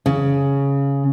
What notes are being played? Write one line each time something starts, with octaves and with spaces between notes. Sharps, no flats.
C#3